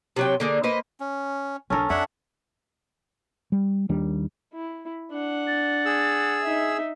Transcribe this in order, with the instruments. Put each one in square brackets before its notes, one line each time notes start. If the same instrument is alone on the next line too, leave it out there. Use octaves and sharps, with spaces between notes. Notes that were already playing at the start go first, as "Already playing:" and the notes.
[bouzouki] C3 F#3 G5
D3 A#3 G#4
A#3 B4 C5 D#5
[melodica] C#4
[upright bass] B1 D4 [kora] C#4 A4 A#4
[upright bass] F2 [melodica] D4 E5 F#5 [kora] C#5
[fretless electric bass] G3
D#2 D#3 G3 D4
[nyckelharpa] E4
D4 F#5
[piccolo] A6
[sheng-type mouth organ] G#4 E6
[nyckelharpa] D#4 E5